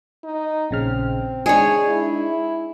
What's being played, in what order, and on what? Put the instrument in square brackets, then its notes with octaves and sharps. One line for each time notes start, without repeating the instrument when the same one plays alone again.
[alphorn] D#4
[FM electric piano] A#1 C#3 F6 [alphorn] C4
[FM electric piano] G#3 D4 D#4 [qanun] G#4 C#5
[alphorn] E4